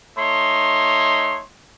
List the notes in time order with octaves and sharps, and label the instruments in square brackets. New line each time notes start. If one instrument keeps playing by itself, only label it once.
[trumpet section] A3 D#4 C#5 C6